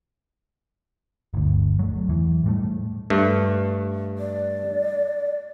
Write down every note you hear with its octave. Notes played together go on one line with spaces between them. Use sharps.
G1 D2
F#3 A3
E2 E3
A2 G3 A3
G2 A3
D5